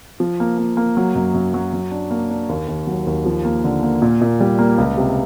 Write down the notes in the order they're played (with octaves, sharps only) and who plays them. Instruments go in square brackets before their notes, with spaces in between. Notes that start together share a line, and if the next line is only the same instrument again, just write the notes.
[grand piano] F3
A#3
A#3
A#3
F#3
F#2
F#2
F#3
F#3
D4
A#3
D4
D#2
D#2
F#3
D#2
F3
A#3
D3
A#3
A#2
A#2
G3
A#3
C#2
C3